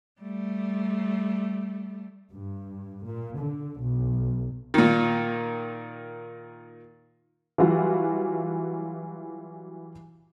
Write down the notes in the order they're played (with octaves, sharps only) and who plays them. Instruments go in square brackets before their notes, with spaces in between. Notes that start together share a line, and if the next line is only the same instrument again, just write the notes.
[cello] G3 A3
[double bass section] G2
A#2
D3
B1
[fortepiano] A#2 D#3
[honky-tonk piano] E3 F#3 G3 F4 F#4